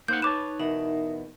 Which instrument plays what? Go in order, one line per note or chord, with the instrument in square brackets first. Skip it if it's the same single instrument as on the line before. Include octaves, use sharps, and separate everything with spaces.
[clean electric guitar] A#3 C5 F#5 [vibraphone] D#4 [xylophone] G6
[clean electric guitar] B4 C#5 A5 [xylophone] D6 E7
[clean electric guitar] E2 B2 [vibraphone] D#4 A#4 E5